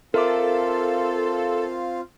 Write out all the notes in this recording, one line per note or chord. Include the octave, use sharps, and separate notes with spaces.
C4 F4 A4 A#4 E5 F5 D6